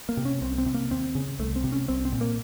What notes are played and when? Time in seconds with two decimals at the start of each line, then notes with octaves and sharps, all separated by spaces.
0.09 A#3
0.17 C3
0.25 C#4
0.41 C2 C4
0.58 C4
0.66 C3
0.74 A#3
0.90 D#2 C4
1.15 C#3
1.39 C2 A3
1.56 C4
1.64 C3
1.72 C#4
1.88 C2 C4
2.05 C4
2.12 A#2
2.21 A#3